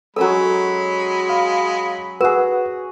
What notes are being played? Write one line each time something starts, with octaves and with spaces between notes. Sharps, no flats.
F#3 G#3 C#4 A4 A#4 B5 E6
F5
F#4 G#4 A#4 B4 F#5